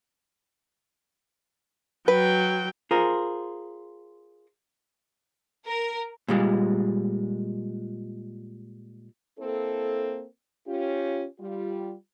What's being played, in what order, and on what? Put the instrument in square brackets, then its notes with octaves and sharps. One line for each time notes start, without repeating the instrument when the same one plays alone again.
[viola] F#3 G5 [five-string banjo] B4
[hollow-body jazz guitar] F4 G#4 A#4 C5
[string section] A#4
[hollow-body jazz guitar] A#2 G3 G#3
[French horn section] A#3 C4 E4 A4
C#4 F4 G4
G3 F4